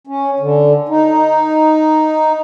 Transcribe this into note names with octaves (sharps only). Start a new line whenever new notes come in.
C#4
D3
D#4